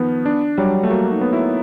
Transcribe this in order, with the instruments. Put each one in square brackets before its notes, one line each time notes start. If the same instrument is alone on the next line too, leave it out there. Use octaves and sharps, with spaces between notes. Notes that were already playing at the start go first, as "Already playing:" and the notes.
Already playing: [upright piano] D#3 F3 [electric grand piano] B3
[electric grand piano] D4
[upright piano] F#3 [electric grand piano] G3
[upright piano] A3
[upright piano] A#3 [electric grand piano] F#4
[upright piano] D#4
[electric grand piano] B3
[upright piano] E4